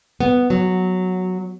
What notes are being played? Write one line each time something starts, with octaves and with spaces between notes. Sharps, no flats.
B3
F#3